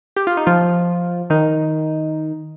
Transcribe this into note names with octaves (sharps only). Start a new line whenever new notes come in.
G4
F4
D#4
F3 F4
D#3 D#4